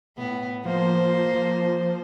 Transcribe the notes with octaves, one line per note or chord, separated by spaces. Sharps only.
A2 B3
F3 A#3 C5
F3